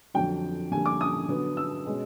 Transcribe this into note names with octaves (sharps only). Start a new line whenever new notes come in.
F2 D3 F#3 G5
F2 D3 G3 A#3 G#5
D6
D#6
D3 F#3 B3
E6
B2 G#3 C#4